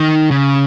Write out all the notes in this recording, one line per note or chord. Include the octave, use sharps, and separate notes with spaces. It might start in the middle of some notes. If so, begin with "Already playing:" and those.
Already playing: D#3
C#3